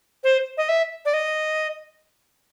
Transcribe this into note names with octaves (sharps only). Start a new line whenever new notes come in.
C5
D#5
E5
D5
D#5